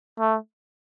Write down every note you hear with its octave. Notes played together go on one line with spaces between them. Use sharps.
A3